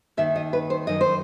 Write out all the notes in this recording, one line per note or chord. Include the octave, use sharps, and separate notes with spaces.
D#2 D#3 E5
D#5
B4
C5
F#2 D#3 D#5
C5